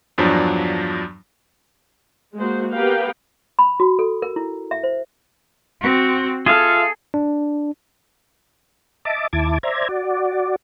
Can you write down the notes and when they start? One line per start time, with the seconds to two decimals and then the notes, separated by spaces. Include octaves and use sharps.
0.18 E2 G2 F3 F#3 D4
2.36 G#3 A#3 F#4 C5
2.74 B3 G4 A#4 B4 F5 G5
3.59 B5
3.80 F#4
3.99 A4
4.22 A#4
4.36 E4
4.71 E5
4.83 C5
5.81 C4 F#4
6.46 F4 G#4 A4 E5 F5
7.14 D4
9.05 D#5 E5 A5 D6
9.33 D#2 E4 A5 D6 G#6
9.63 C5 D5 E5 A#5 G#6
9.89 F#4 D5